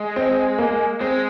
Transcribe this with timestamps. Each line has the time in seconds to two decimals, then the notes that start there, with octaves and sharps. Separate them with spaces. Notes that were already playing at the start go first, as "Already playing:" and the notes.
Already playing: G#3
0.16 C4
0.59 A#3
1.01 G#3 C4